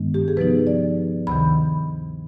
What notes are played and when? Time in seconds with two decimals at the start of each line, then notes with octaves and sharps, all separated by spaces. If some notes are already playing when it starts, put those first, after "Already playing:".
Already playing: G2 D#3 G#3 B3 D4
0.14 G4
0.28 G#4
0.37 C3 F3 B3 D#4 B4
0.67 D5
1.27 D2 C3 D#3 B5